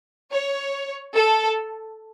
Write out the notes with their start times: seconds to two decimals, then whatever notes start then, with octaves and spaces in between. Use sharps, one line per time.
0.32 C#5
1.16 A4